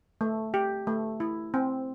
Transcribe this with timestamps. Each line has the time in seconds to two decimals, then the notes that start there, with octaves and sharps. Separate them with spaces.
0.21 A3
0.54 G4
0.87 A3
1.20 E4
1.54 C4